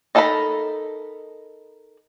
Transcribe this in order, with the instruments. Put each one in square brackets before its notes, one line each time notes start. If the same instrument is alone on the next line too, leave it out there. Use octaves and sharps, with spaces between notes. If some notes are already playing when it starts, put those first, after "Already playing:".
[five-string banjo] D#4 A4 A#4 F5 B5